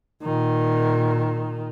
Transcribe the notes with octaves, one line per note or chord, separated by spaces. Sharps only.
A#2 D#3